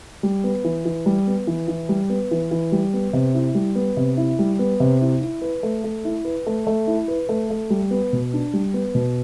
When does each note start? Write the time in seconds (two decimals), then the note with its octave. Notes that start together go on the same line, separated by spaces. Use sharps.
0.23 G3
0.44 B3
0.64 E3
0.85 E3
1.06 G3
1.27 B3
1.47 E3
1.68 E3
1.89 G3
2.10 B3
2.31 E3
2.51 E3
2.72 G3
2.94 B3
3.13 C3
3.34 E4
3.55 G3
3.75 B3
3.97 C3
4.17 E4
4.39 G3
4.59 B3
4.80 C3
5.01 E4
5.21 E4
5.42 B4
5.63 A3
5.84 A3
6.05 E4
6.25 B4
6.46 A3
6.67 A3
6.87 E4
7.08 B4
7.29 A3
7.50 A3
7.70 G3
7.91 B3
8.13 B2
8.33 D4
8.53 G3
8.74 B3
8.95 B2